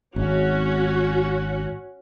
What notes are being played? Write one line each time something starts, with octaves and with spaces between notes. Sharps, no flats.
G#1 C#4 F#4